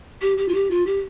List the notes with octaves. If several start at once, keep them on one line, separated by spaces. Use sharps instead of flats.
G4
G4
F4
G4
F4
G4